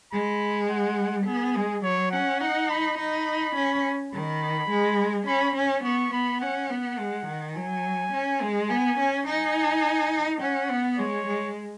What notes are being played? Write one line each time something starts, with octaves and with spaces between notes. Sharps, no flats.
G#3 B5
F#5
B3 G#4
G#3
F#3 C#5
C#4 F#5
D#4 F#5
B5
D#4 B5
C#4
D#3 B5
G#3
C#4 B5
C#4
B3 C#6
B3 B5
C#4 F#5
B3 F#5
G#3
D#3
F#3 G#5
C#4
G#3
B3 G#5
C#4
D#4 G#5
C#4 F#5
B3
G#3 C#5
G#3